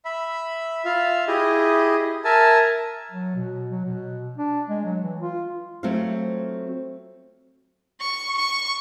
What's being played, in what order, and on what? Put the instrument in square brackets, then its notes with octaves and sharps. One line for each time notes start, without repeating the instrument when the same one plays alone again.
[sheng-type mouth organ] E5 B5
F4 E5 F5
E4 G4 G#4 D#5
A#4 E5 G#5 A5
[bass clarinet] F#3
B2
F#3
B2
D4
G#3
F#3
E3
F4
[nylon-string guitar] F#3 A3 C4 F4 C5 F5
[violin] C#6
C#6